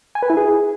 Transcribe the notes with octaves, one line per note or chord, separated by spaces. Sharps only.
G#5
B4
E4
G#4